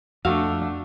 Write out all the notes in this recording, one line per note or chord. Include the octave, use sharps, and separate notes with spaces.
F2 A3 D4 F#4 E5 F5